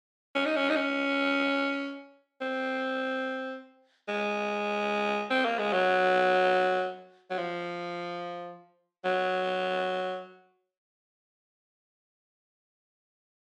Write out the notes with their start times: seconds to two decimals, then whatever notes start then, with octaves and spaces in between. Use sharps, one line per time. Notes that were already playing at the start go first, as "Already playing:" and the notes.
0.35 C#4
0.46 D#4
0.56 C#4
0.70 D#4
0.77 C#4
2.41 C4
4.08 G#3
5.31 C4
5.45 A#3
5.59 G#3
5.73 F#3
7.30 F#3
7.38 F3
9.05 F#3